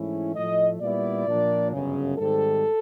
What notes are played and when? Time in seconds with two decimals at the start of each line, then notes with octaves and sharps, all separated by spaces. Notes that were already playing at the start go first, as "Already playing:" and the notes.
Already playing: G#2 E3 A3 C#4 E4
0.36 A2 F3 A3 D#5
0.81 A#2 G3 B3 E4 D5
1.27 A#2 F3 A#3 D4
1.73 G1 F#2 C#3
2.18 G#2 D#3 G3 C4 A4